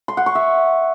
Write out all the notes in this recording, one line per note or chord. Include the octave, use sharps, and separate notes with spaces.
C6
F#5
C#6
E5